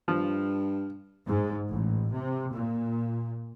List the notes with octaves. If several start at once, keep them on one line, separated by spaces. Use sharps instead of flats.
G2 F3
G#2
A1
C3
A#2